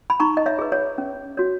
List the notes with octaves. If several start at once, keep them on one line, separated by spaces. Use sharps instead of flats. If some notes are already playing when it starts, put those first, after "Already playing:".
B5
D#4 A#5 C#6
D#5
C#5 E5
G#4 B4
C#5
C#4
F#4 C#5